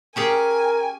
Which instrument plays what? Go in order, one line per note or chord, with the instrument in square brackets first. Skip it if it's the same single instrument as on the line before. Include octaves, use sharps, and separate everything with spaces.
[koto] C#4 G4 G#4 [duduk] A#4 [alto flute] G5 [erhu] G#5